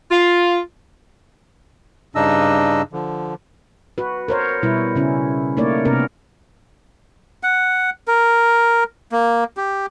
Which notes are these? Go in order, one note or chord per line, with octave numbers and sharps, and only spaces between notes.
F4
G2 C#3 D4 D#4 D#5 E6
D3 F3
F#4 B4
A#4 C5 C#5
B2 G3 E4 B4
C#3 C#4 E4
A3 A#3 D#4 A#4 C#5 D5
C3 B3 C#4 A#4
F#5
A#4
A#3
G4